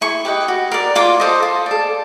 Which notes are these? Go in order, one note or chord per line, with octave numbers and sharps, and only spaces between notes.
E4 C#6
G4 B4 D#5
F#4
A#4 D5
F4 D6
A4 C5 D#5
F4
A4 D5